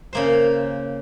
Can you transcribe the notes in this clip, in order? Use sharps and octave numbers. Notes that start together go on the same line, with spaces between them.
C#3 A#3 C5